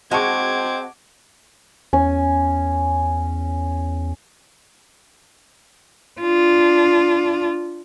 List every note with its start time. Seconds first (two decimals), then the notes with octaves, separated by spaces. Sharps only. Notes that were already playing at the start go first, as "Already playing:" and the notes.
0.11 G#3 C4 F#4 A5 C#6 D6 G#6
1.93 E2 C#4
6.21 D4 F4